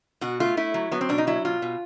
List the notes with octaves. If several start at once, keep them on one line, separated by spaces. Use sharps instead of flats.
B2 F#4
A3 F4
A3 E4
F#3
F#3 B3
C4
B2 D4
D#4
F#3 E4
B2 F4
B2